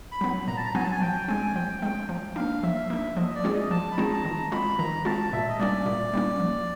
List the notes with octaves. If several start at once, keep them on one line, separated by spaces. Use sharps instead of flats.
B5
F#3 B3
A#2 A#5
A5
A#5
F#3 B3 G#5
A5
G#5
F3 G5
G#3 C4 G#5
F3 G5
G#3 C4 G5
F3
A#3 D4 F5
F3 E5
A#3 D4 E5
F3 D#5
D5
G#3 C4 F4 G#4
D#5
F3 A5
B5
G#3 C4 F4 G#4 A#5
A5
D#3 A#5
G#3 C4 F4 B5
D#3 A#5
G#3 C4 F4 A5
A#2 E5
D#5
G3 A#3 C#4 D5
A#2
G3 A#3 C#4
F3